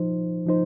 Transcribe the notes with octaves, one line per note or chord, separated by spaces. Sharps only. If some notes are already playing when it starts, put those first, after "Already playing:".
Already playing: F3 D#4 C5
F3 D#4 C5